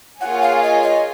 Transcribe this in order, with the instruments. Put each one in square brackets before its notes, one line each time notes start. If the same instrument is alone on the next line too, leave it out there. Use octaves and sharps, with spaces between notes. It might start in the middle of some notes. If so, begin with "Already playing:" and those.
[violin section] A#3 F4 G#4 C#5 G#5 [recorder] F#5
[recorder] F5
D#5
D#5